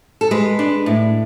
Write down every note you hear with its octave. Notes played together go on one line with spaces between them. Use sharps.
A4
G#3 B4
D4
A2